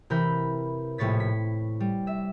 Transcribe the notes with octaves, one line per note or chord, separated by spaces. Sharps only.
C3 E3 A#4 B5 G6
A#1 A2 C3 C#5 A6 B6
B6
G3
E5